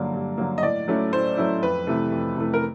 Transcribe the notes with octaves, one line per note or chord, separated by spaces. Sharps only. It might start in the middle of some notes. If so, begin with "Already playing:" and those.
Already playing: G2 D3 F#3 A#3
G2
D3 F#3 A#3
D#5
A2 D5
F#3 A3 C#4 E4
A2 C5
F#3 A3 C#4 E4
F2 B4
C3 E3 A3
F2
C3 E3 A3
A#4